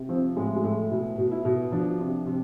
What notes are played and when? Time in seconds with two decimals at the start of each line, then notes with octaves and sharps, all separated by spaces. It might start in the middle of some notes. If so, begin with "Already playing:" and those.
Already playing: C3
0.09 F3 C4
0.37 A2 G#3
0.56 G#3
0.64 A2 A3
0.91 B2 E4
1.18 B2
1.32 E4
1.45 B2
1.72 F3 D4
2.00 C3
2.27 C3